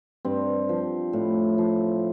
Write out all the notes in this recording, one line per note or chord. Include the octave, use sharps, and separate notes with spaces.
G2 C4
F3
A2
F3